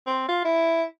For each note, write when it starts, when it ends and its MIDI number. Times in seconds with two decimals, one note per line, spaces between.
0.07 0.28 60
0.28 0.41 65
0.45 0.83 64